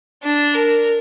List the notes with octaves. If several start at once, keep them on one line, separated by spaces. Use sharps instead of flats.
D4
A#4